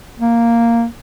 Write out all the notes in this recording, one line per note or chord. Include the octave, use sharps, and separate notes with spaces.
A#3